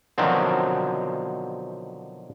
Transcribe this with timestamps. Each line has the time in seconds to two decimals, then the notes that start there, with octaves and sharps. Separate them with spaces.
0.18 B2 D3 D#3 F3 F#3 C4